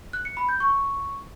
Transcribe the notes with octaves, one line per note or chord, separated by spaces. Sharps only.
F#6
C#7
B5
G6
C#6